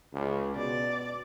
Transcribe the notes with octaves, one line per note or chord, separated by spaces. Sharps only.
C#2
B2 D5